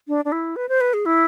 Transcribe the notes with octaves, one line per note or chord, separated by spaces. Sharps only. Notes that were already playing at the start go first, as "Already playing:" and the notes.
D4
D4
E4
B4
C5
B4
G#4
E4